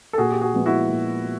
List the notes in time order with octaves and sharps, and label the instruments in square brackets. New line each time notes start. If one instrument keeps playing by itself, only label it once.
[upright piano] A4
[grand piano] A#2 [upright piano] F#4 G#4
[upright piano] G4
F#4 G#4
[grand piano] F3 G#3 B3
[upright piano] E4 F#4
[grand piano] A#2